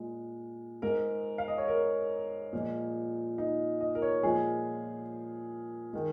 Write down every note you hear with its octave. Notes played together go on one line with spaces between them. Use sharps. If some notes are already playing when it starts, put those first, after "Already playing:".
Already playing: A#2 G#3
G#2 G#3 A#4
F5
D#5
C#5
A#4
A#2 F3 G#3
D#4
D#5
A#4
C#5
A#2 F3 G#3 G#4
D#3 G#3